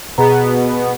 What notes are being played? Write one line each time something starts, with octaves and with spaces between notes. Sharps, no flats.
B2 B3 G#4 A#5